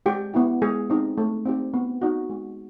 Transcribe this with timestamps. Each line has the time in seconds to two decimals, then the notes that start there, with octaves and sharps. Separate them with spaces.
0.06 G#3 G4
0.34 B3 E4 G4
0.62 G#3 G#4
0.90 C4 D#4 G4
1.18 A3
1.46 C4 D#4 G4
1.74 B3
2.02 D#4 F#4
2.30 G#3